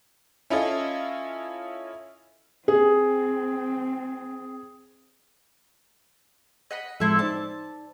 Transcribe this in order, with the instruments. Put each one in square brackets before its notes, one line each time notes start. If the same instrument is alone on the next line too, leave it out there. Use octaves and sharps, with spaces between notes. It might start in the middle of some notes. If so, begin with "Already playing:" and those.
[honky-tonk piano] C#4 E4 F4 A4 D#5
[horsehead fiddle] C4 [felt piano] G#4
[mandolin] D#5 F#5 B5
[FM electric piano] A2 F3 G#3 [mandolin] C4 E4 A4
[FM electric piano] D#4 C5 D5 [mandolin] A5